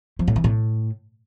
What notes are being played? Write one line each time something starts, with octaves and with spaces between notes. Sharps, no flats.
F3
A2
E3
A2